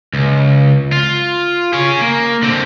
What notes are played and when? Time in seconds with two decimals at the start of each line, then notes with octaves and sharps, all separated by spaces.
0.13 C#2
0.92 F4
1.73 G#4 C#5
2.01 A#3
2.42 D3 C4